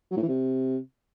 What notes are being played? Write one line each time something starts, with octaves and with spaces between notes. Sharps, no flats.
F#3
A2
E3
C3